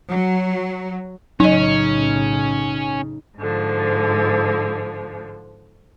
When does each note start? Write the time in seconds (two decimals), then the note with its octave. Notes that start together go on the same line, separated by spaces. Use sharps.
0.11 F#3
1.40 B1 A2 C#3 F#3 C#4 D#4 D#5
3.38 G#2 D3 F3